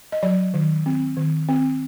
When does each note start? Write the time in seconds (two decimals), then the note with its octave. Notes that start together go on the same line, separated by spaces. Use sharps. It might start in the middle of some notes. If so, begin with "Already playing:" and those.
0.12 D#5
0.23 F#3 D5
0.54 D#3
0.86 C4
1.17 D#3
1.49 C4